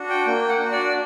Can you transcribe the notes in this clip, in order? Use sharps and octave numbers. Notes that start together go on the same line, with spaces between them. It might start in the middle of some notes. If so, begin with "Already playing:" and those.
Already playing: D4 F#4
G5
A#3 G5
F#5
D4 F#4
D5